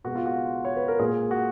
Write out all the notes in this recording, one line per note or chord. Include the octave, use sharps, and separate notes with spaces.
B2 G#3 F#4
F4
F#4
C#5
B4
A#4
A#2 G#3 G#4
F#4